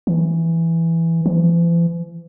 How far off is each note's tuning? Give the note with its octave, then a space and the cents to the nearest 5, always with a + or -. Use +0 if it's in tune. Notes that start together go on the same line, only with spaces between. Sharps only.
E3 +5
E3 +45